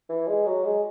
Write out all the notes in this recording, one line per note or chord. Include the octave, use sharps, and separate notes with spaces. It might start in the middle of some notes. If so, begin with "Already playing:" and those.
E3
G#3
F#3
G#3